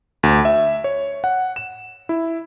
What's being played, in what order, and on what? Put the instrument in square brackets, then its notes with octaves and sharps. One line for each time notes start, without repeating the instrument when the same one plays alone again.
[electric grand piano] D2
E5
C#5
F#5
E7
E4